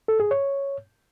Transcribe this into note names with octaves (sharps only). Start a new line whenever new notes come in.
A4
G#4
C#5